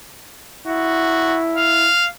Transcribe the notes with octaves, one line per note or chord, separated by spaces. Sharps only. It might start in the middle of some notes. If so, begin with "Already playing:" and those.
E4 F#4
F5